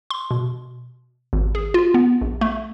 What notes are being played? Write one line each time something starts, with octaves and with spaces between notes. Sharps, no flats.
C6
B2
G#1
G#4
F4
B3
A#1
A3